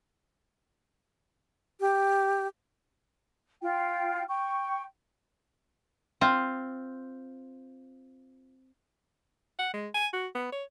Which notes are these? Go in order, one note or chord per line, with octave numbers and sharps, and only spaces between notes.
G4
F4 G5
G5 C#6
C4 F4
F#5
G#3
G#5
F#4
B3
C#5